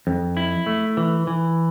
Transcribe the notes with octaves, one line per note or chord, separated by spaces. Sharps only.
F2
E4
A3
E3
E3